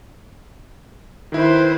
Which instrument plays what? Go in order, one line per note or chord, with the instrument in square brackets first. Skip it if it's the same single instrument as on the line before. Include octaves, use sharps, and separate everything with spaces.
[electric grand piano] D#3 E4 [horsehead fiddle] B4 C5